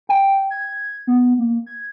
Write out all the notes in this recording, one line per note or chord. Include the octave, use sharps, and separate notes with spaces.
G5
G#6
B3
A#3
G#6